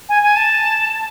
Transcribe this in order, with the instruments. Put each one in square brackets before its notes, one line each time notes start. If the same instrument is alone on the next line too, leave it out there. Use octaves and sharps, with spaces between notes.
[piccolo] G#5
G#5
A5